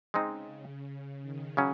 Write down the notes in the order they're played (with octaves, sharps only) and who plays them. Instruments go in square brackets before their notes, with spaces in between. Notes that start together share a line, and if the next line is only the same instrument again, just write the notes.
[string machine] C#3 [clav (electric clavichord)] G#3 C4 D#4
[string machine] C#3
D#3
[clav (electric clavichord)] C#3 F#3 C#4